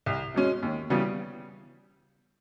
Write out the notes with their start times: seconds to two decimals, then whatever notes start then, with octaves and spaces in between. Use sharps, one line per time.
0.06 C2
0.34 B2 G#3 C#4
0.63 D#2
0.90 C#3 E3 G3 B3